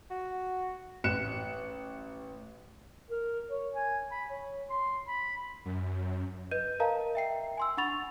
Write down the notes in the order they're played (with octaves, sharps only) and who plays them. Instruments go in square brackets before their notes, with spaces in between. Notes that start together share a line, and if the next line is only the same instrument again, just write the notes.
[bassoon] F#4
[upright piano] A1 F#6 C#7 E7
[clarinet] A#4
C#5
G#5
B5
C#5
C6
B5
[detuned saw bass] F#2
[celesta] B4 D#5 G6 D#7
A#4 D#5 F5 A5 A#5
E5 G5 C7
G#5 C6 E6
D4 F#5 B5 C#6 A6 F7